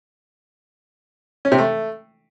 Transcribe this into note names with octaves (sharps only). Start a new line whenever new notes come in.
C#4
C3
A3